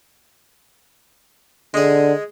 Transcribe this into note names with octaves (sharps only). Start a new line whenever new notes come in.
D3 G#3 G#4